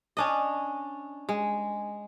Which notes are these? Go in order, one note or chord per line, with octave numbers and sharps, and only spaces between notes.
C#4 D4 D#5
G#3